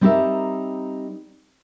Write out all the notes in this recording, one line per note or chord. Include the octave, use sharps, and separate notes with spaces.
G3 C4 D#4 G4 A#4 E5